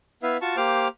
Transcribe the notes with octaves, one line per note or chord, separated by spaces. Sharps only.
B3 E4 B4 E5 F5
F4 F#4 A5 C#6
A#3 G4 C5 F5 D6 F6